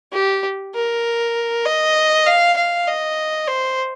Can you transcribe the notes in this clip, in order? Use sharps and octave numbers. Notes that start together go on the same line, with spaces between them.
G4
A#4
D#5
F5
F5
D#5
C5